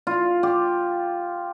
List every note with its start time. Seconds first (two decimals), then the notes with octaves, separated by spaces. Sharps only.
0.07 F4
0.43 G4